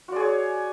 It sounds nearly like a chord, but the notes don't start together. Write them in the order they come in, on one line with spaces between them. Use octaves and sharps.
F#4 D5 G#4 C#5